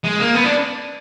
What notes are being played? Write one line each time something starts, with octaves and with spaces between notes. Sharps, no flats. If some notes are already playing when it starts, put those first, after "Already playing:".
G#3
A#3
B3
D4